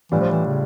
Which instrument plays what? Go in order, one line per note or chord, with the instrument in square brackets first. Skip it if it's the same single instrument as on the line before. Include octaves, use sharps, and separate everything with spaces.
[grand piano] A2 G3 D4 F4 [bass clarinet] E3
[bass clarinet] F3
E3
C#3